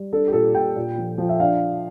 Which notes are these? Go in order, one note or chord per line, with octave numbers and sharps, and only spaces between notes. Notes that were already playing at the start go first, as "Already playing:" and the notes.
Already playing: G3
D4 A4
G4
A#2 A4
A#2 G5
A#2
F3
F3
E5
D4 F5